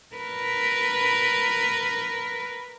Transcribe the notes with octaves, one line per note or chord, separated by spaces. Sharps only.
A#4 B4